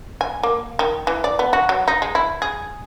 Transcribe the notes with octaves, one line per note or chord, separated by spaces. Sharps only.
G#5
A#3
D#3
E3
D5
B3
F#4
F#3
D#4
G#3
E4
G#4